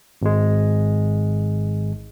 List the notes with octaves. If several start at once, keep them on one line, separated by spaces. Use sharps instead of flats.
G#1 G#3